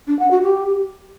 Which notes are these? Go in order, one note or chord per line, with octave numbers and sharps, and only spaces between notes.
D4
F#5
F#4
G4